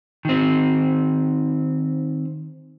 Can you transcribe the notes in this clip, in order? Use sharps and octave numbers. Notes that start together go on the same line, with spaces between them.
D#3 C4